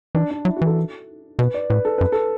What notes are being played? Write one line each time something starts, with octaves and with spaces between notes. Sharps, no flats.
E3 D4
D4
F#3 E4
F#4
E3 A4
B2 B4
D5
A2 B4
A4
F#2 B4
A4